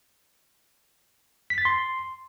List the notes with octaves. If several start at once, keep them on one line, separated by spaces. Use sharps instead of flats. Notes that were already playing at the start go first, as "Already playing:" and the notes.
B6
A6
C6